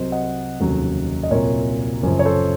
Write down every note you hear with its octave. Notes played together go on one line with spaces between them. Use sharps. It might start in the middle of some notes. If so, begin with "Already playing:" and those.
Already playing: C2 C3 F#3 C5 D#5
D#5 F#5
F1 D#2 C#3 F#3
D#5
C2 A#2 F#3 A#4 C#5
F#1 F#2 F3
C#5
A4 C5